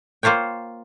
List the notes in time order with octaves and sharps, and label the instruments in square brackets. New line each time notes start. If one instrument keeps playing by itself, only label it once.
[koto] A#3 F4 C5 C#5 G5